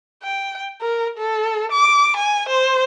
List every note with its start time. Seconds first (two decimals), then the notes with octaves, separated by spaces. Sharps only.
0.23 G5
0.81 A#4
1.18 A4
1.72 D6
2.16 G#5
2.49 C5